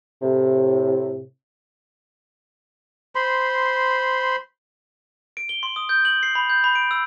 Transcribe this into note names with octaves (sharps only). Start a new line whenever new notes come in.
A2 C3
C5 B5 C6
D7
G7
C6
D#6
G6
F#7
C7
B5
G6
B5
D7
E6